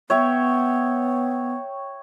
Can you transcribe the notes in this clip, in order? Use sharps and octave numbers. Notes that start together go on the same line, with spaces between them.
B3 C#5 E5 G5